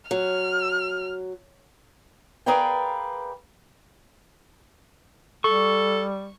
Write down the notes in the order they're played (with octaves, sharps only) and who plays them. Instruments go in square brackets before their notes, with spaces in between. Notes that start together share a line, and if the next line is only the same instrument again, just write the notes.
[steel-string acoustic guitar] F#3 [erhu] F6
[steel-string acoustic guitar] G#4 A#4 B4 D5 F5 G5
[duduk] G3 [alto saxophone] A4 [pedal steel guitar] C#6